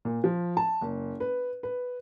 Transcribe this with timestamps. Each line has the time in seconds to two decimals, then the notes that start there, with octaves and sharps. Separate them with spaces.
0.05 A#2
0.24 F3
0.57 A5
0.81 F#1
1.20 B4
1.63 B4